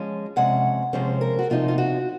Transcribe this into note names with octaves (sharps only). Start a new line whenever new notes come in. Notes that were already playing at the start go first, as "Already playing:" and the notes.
Already playing: F3 G#3 C#4
C3 F3 G#3 C#4 F#5
C3 F3 G#3 C#4 C5
A#4
F#4
C3 F3 C4 D#4 F4
F4
F#4